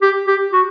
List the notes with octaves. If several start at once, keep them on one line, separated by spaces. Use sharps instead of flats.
G4
G4
F#4